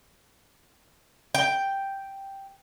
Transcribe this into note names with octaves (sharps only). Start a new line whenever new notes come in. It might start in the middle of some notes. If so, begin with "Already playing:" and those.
G5